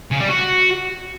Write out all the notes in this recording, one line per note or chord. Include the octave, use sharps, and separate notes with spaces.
C#3
G3
F#4